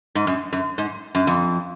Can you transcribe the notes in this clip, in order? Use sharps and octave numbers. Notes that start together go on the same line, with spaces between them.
G#2
F#2
F#2
G#2
F#2
F2